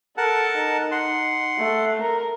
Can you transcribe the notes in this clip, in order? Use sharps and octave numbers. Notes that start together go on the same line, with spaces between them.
A4 A#4 F#5 A5
D#4
F#5 C6
A3
A#4